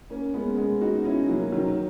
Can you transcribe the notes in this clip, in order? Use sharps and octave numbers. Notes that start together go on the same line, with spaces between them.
A#3 C#4
G#3 B3
G#3 B3
D#4 F#4
C#4 E4
F#3 A#3
D#3 F#3